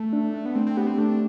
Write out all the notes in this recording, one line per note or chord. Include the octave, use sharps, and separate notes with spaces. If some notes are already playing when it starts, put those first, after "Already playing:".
Already playing: A3
D4
D4
B3
A3 C4
C4
B3 G4
C4
A3 D4